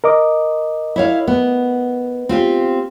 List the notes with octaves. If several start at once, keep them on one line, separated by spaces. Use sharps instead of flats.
A#4 D#5 D6
E4 C#5 F5
B3
C4 F4 G4